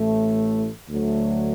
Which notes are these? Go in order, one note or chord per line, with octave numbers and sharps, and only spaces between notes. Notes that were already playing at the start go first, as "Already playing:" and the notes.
Already playing: A1 A2 A3
D2 D3 F#3 A3